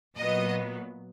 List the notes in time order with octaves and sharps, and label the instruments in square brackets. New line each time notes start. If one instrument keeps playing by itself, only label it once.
[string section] A#2 F#3 B3 D#5